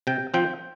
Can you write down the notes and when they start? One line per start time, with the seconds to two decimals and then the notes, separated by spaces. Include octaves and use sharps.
0.07 C3 G5
0.34 F3 C4 G5